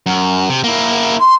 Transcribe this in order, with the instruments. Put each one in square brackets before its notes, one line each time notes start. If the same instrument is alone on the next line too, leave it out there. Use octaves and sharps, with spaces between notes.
[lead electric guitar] F#2
C3
A#3 E4
[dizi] C6